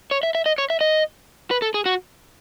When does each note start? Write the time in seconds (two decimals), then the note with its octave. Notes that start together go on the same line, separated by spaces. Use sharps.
0.11 C#5
0.23 E5
0.35 E5
0.46 D#5
0.58 C#5
0.70 E5
0.81 D#5
1.51 B4
1.62 A4
1.74 G#4
1.86 F#4